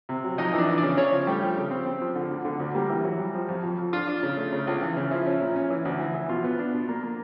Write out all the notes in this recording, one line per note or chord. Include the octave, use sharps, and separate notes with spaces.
C3
F#3
F2 D#4 D#5
E3 D4 D5
E3
D4 D5
C#3
C#3 C#4 C#5
F3
G3 A3 G4
F3
C#3
C4
C4
F3
D3
D2
D3
D2
G3 A#3 G4
E3
E3 F#3 F#4
G3
F3
F2
F2
F2
D4 F4
D4
C#3
A3
C#3
C#2
E3
C#3
F3 E4
C#4
A#2
C#4
E3
D2
E3
E3
B2 F4
B3
D4
B2
A#3
A#3